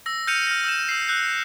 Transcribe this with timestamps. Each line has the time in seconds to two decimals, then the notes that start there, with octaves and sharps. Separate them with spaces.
0.06 E6 A#6
0.27 F6 G6 A#6 C#7 D#7 F7
0.47 F6 A#6
0.64 E6 G6 E7
0.89 E6 C7
1.08 E6 F#6 G6 C7